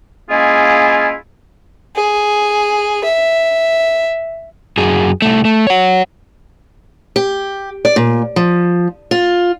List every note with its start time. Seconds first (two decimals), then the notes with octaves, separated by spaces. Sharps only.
0.30 G#3 A#3 C#4 E4 F4 G#4
1.95 G#4
3.04 E5
4.78 F#2 G#4
5.22 C2 A3
5.45 A3
5.67 C#5 F#5
7.16 G4
7.85 D5
7.96 A#2
8.36 F3
9.11 F4